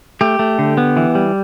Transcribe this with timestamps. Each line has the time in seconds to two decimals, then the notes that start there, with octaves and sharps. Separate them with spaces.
0.21 A3 G4
0.39 A3
0.59 D3
0.77 B3
0.97 E3
1.15 G3